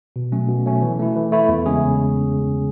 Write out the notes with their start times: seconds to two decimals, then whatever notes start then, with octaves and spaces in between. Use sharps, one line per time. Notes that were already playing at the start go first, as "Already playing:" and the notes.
0.16 B2
0.32 F#3 A3 C#4
0.48 B2
0.66 F#3 A3 C#4
0.82 E3
0.99 A3 E4
1.16 E3
1.32 A3 E4
1.48 E2
1.66 C#3 G#3 C#4 G#4